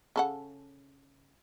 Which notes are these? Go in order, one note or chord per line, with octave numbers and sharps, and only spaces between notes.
C#3 A4 F#5